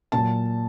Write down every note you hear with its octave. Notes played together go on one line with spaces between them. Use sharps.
A#2 F#3 A5